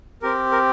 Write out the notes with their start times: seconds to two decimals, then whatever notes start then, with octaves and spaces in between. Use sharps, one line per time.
0.22 C4 G4 A#4
0.52 A#4